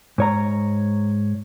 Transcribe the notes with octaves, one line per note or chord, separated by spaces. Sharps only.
G#2 C#5 A#5